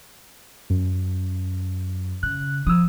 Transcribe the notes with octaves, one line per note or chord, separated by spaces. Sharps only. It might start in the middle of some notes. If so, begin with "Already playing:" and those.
F#2
C#3 F#6
F3 D#6 E6